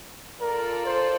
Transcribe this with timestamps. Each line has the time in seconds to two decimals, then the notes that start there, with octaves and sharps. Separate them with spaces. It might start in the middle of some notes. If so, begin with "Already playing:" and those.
0.40 F4 A4 A#4 D5
0.86 C5